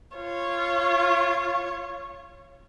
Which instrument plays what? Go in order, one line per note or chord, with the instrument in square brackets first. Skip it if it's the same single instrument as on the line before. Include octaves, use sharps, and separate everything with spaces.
[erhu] F4 [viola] C#5